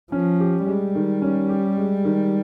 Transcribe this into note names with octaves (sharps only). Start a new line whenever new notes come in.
F3 C#4
G4
G3 G#3
D#3
C#4
G4
G#3
D#3